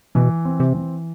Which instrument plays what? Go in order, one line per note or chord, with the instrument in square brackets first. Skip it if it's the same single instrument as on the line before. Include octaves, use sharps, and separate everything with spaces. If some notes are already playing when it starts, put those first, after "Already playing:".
[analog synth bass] B2 [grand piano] E3
[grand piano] C4
[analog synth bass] C3
[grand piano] E3